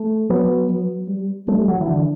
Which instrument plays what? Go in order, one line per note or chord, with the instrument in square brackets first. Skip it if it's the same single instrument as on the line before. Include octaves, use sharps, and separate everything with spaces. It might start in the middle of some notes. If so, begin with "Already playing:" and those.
Already playing: [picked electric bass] A3
[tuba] F#3 [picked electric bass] B3
[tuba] F#3
G3
[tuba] G3 [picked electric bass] A3
[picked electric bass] F#3
E3
D3